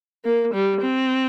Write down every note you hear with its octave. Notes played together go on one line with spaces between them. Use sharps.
A#3
G3
C4